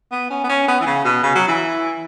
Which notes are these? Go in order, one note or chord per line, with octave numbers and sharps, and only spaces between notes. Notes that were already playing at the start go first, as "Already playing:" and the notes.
B3
C#4
B3
C#4
B3
E3
C#3
B2
C#3
F#3
E3